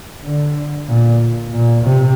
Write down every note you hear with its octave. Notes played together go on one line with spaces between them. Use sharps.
D3
A#2
A#2
C3